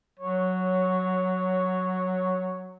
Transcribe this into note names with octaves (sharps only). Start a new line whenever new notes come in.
F#3 C#5